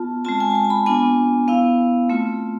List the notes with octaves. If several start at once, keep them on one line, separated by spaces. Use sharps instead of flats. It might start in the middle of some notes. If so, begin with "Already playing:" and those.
Already playing: B3 F4 A5
G#3 C4 F4 A5
G#5
A5
G#5
A5
B5
B3 D4 F4 G#5
B3 E4 F5
A3 C4 F4